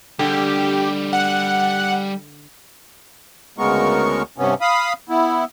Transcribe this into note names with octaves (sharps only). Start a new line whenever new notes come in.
D3 G3 G4 G#4
F#5
D2 C#3 G#3 B3 A#4 C#6
G2 C3 B3 C#4
F5 B5 D#6
B3 E4